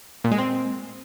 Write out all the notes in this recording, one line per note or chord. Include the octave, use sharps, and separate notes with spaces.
A#2
G#3
C4